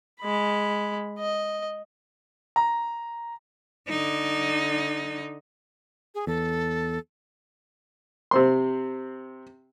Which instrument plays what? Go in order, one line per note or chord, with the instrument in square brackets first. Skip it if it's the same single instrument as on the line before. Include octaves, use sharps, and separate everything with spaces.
[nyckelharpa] G#3 B5
D#5
[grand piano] A#5
[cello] D3 D#4
[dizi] G#4
[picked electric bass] E2 [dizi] A4
[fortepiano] C3 C4 C6